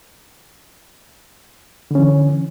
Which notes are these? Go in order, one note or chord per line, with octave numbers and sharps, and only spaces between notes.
D3 E3 C#4